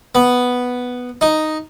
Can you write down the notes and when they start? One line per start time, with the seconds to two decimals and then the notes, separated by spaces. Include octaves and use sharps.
0.15 B3
1.21 D#4